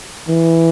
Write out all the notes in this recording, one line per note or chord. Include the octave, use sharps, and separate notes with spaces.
E3